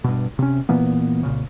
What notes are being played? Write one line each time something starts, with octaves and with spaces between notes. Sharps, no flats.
G2 B2
C3 C#4
A#2 E3 A#3 B3
C2 A#2 C#3